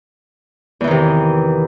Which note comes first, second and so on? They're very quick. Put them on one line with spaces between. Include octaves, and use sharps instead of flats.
E2 E3 D#3 C3